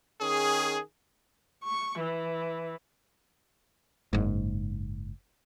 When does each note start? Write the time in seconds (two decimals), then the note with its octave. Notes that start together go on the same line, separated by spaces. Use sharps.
0.21 D#3 C#4 G#4
1.64 C#6
2.00 E3
4.13 F#1 G#2